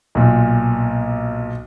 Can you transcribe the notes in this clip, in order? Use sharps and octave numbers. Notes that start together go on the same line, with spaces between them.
B1 A#2